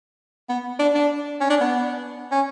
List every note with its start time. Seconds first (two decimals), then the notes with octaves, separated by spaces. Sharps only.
0.49 B3
0.79 D4
0.95 D4
1.41 C#4
1.50 D4
1.61 B3
2.32 C#4